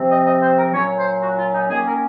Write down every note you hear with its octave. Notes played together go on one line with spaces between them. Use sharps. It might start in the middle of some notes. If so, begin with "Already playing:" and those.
Already playing: C3 F3 C4
D#5
D#5
C5
A#4
A#2 F#3 C#4 C#5
C5
F#4
F4
D#4
D#3 A#3 C#4 G#4
A#4